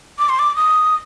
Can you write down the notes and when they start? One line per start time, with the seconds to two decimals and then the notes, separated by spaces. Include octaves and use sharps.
0.19 D6
0.29 C6
0.39 D6
0.56 D#6